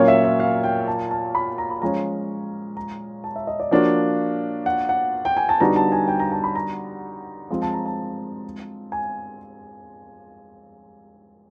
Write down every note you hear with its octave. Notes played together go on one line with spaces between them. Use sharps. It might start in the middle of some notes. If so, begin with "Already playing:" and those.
Already playing: A#2 F#3 A#3 C#4 F4 C#5
E5
E5
F5
G5
A5
A5
B5
A#5
B5
F3 G#3 C#4 A#5
A#5
A5
E5
D#5
D5
F3 A#3 D4 F#4 C#5
F#5
F#5
G5
G#5
A5
D3 G3 B3 D#4 F#4 A#5
A5
G#5
G5
A#5
A5
B5
A#5
F3 G#3 C4
A5
A#5
A5
G#5